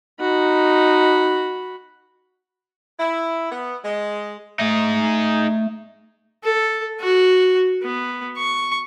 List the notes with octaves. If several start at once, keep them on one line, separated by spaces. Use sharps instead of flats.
D#4 F#4 B5
E4
B3
G#3
A3 D#4 G#4
A4
F#4
B3
C#6